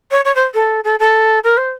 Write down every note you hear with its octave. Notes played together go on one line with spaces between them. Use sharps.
C#5
C#5
C5
A4
A4
A4
A#4
C5